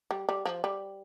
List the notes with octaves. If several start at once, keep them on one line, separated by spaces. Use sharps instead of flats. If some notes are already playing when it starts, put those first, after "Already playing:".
G3
G3
F3
G3